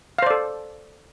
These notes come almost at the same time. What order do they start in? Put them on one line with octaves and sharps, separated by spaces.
F5 C5 D5 A4